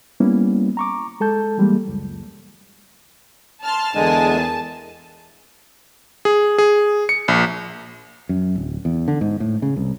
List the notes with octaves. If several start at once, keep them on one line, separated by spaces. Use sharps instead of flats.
G3 A#3 B3 C#4 E4
A#5 C#6 D6
G#3 A4 A5 G6
E3 G3 G#3 A#3
C#2 F#2
A5 C6 F6
E2 D3 G#3 G#4 A#4 G#5
G#4
G#4
C#7
A#1
F#2
D1
E2
D3
G#2
A2
C#3
C2